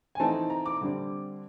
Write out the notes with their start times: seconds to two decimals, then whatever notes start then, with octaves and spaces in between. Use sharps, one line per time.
0.15 G#5
0.20 E3 A3 C4 D#4 A5
0.50 A#5
0.66 D6
0.81 D3 G3 C4